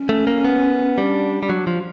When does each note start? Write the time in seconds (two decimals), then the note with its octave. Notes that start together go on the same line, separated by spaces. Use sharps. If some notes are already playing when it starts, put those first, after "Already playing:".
Already playing: C#4
0.09 A3
0.27 A#3
0.45 B3
0.97 G3 D4
1.43 G3
1.50 F#3
1.67 F3